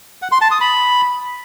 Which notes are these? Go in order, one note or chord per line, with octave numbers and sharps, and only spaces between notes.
F#5
C6
A5
D#6
B5